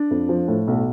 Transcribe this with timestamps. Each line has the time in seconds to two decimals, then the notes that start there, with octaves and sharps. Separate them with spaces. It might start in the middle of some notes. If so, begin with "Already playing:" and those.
Already playing: D4
0.11 F2
0.29 F3
0.48 A2
0.67 B1